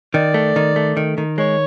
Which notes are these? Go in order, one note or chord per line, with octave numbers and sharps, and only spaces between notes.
D#3 D5
A3
D#3
A3
D#3
D#3
G#3 C#5